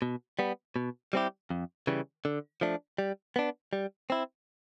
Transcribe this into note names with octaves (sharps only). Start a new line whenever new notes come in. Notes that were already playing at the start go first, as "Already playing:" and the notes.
B2
G3 B3
B2
G3 C4 E4 G4
F2
C#3 E3 G3
D3
F3 A3 D4
G3
B3 D4
G3
C4 E4